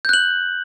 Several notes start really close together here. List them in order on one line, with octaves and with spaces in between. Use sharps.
G6 F#6 F#7